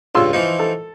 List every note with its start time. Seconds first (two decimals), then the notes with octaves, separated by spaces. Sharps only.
0.15 C#2 G2 F4 C6 E6
0.33 E3 F3 D#4
0.59 A4